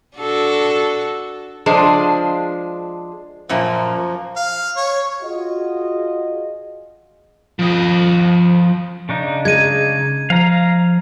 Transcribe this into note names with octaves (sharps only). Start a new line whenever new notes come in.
D4 F#4 A4
F3 G#3 D4 C5
F#2 A#2 F3 A#3
F5
C#5
F4 F#4 G#4 D#5
F3 D#5
C#3 D4 D#4
G#3 G#6 D#7
F3 F5 A#5